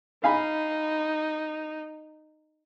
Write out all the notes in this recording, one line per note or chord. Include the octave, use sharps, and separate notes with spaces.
D#4 F5 G#5 B5